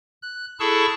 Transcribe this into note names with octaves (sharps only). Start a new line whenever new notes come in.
F#6
E4 G#4 A4 A5 C#6 E6